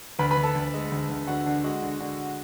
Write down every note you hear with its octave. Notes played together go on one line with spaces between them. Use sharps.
D2 B4 B5
B4 B5
D2
A4 A5
D2
G#3
D2
D2
D3 F#4 F#5
D3
G#3 F#4 F#5
D3
D3